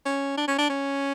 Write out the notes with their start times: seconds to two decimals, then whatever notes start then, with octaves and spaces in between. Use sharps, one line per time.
0.06 C#4
0.37 D4
0.48 C#4
0.58 D4
0.69 C#4